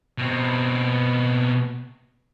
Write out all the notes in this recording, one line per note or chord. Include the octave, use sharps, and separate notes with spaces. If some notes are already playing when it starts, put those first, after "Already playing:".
B2 C4